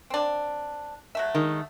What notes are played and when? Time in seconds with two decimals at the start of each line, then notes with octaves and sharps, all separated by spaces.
0.10 C4 D4
1.15 F#3 A3 E5
1.35 D#3 G#3